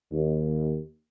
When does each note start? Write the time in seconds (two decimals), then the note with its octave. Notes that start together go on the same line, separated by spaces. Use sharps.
0.11 D#2